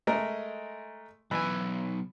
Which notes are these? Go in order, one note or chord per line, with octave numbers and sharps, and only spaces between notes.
G#3 A3 A#4
B1 E3 G#5